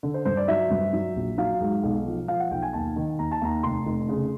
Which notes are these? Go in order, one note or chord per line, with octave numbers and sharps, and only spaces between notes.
D3
C5
G2 C5
D5
F#3 E5
G2
F#3
A#1
F#3 F5
G#2
B1
F3
F3 F5
F#5
B1 G5
G#5
D#2 A5
D#3
D#2 A#5
A5
D#2 A#5
F1 C6
F1
C#3